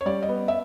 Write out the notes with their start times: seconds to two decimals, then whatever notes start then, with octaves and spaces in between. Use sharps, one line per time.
0.01 C#5
0.06 G3 D5
0.23 D#5
0.29 B3
0.48 E5